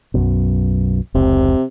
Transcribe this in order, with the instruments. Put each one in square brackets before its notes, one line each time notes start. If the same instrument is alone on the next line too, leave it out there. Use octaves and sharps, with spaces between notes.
[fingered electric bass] B1 F#2 B2
[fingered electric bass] F1 C#2 [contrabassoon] C3